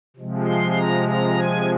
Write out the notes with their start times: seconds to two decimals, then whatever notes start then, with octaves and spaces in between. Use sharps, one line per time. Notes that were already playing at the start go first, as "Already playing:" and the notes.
0.17 C3 F3 G#3
0.47 C6
0.77 A#5
1.08 A#5
1.38 G#5